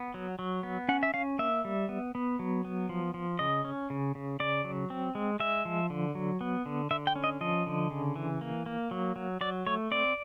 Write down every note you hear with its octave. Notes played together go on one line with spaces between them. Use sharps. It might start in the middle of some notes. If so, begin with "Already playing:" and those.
Already playing: B3
F#3
F#3
B3
C#4 F#5
E5
C#4 F5
A#3 E5
G3
B3
B3
F#3
B3
F3
F3
C#3 D#5
C#4
C#3
C#3
C#3 D5
F#3
C4
G#3
G#3 E5
F3
D3
F#3
B3
D3
D3 E5
G5
C#4
D#5
F3 D#5
D3
C#3
E3
A#3
A#3
F#3
F#3
F#3 D5
A3 C#5
C4 D5